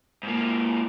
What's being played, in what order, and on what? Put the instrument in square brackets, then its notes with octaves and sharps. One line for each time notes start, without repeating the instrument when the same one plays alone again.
[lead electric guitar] G#2 A#3